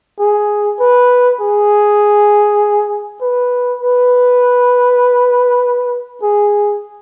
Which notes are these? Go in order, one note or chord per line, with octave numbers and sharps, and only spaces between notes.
G#4
B4
G#4
B4
B4
G#4